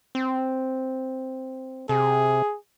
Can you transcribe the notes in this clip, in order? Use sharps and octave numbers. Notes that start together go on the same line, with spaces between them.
C4
C3 G#4